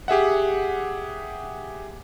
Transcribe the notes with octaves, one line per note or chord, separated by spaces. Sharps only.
G4 G#4 E5 F#5